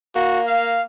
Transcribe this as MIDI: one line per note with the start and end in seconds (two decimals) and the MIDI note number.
0.15 0.80 58
0.15 0.40 66
0.47 0.83 77